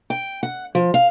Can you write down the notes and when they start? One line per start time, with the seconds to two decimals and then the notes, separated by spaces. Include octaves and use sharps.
0.10 G5
0.43 F#5
0.75 F3
0.94 F5